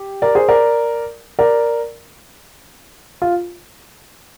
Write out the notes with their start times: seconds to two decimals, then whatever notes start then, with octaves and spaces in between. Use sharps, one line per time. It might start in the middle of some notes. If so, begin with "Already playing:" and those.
Already playing: G4
0.22 A#4 D5
0.35 G#4 C5
0.48 A#4 D5
1.39 A#4 D5
3.22 F4